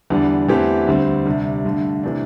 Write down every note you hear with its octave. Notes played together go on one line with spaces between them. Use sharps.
E2 D3 G3 D4
E2 E3 A3 C4 G4
D2 D3 G3 C4
D2 C3 G3 D4
G2 D3 A3
C3 E3 A3 D4